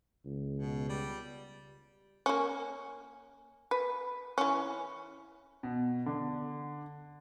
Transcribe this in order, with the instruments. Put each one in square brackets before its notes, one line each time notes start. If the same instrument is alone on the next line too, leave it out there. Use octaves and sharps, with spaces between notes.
[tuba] C#2
[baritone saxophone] B2
G3
[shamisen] A#3 C#4
B4
E3 C#4
[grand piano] B2
D3